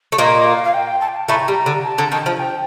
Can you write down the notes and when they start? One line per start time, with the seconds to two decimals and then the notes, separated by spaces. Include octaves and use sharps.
0.12 A3
0.18 A#2 A#3 D#5
0.46 F5
0.64 F5
0.74 G5
1.01 A5
1.08 G5
1.16 A5
1.28 A2 A3 A#5
1.48 G3
1.66 D3
1.84 A5
1.98 D3
2.12 D#3 A5
2.26 F3
2.39 G5